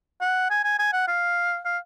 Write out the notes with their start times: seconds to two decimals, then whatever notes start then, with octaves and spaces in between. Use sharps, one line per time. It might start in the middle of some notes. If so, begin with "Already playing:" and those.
0.21 F#5
0.50 G#5
0.64 G#5
0.79 G#5
0.93 F#5
1.08 F5
1.65 F5